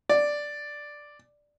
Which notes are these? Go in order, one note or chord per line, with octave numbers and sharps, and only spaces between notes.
D5